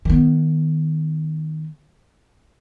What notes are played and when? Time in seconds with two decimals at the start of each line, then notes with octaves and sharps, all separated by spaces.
0.05 D#3 B3